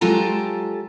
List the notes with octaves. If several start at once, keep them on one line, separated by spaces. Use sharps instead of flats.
F#3 G#3 F4 G4 A4 A#5